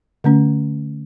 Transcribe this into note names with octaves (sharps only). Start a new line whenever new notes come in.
D3 A3 C#4